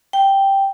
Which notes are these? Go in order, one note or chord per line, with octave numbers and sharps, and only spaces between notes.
G5